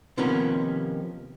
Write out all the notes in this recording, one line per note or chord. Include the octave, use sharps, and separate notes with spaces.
C3 D#3 F3 A#3 B3 C#4